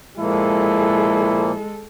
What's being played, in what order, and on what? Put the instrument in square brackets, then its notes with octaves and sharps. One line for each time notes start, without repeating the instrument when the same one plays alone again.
[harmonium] A#2 F3 A#3 [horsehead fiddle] G#3 A4 [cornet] E4